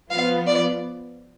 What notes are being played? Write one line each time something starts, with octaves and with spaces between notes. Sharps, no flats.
F3 B3 F4 F5
D5